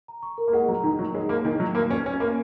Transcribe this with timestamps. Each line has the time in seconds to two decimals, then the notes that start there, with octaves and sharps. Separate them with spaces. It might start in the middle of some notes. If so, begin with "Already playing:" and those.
0.08 A#5
0.23 C#6
0.38 A#4
0.48 A#3
0.53 G#3 F#5
0.69 F#3 A#5
0.84 D#3 D#4
0.99 F#3 C#6
1.15 G#3 C#5
1.29 A#3 C#5
1.44 D#3 G#5
1.59 F#3 C#6
1.75 A#3 F#4
1.91 C#4 G#5
2.06 C#4 C#6
2.20 A#3 A#4